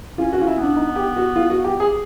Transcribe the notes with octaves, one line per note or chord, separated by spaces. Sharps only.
C#4 F4
F#4
C#4 F4
E4
B3 D4
D#4
G4
F#4
F4
F#4
G4
G#4